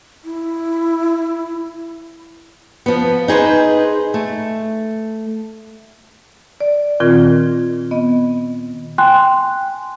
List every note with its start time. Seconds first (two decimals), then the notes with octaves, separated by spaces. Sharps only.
0.24 E4
2.86 F3 B3
3.28 D#4 G#4 B4 C5
4.14 A3
6.61 D5
7.00 A#2 D#3 C4 F4 A#4 G#6
7.91 B3 D#5
8.98 G5 G#5 C6 F#6